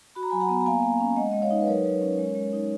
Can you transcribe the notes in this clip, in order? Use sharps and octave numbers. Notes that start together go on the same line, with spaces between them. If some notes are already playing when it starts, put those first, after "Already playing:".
F#4 B5
A#5
F#3 G#5 B5
F#5 A#5
B3
A#5
A#3 F5 G#5
A#3
C#4
G#3 D#5 F#5
G#3 D#5
C#5 F5
D#4
B4
F#3 A#4 C#5
F#3
C#4
G#3
G#3
D#4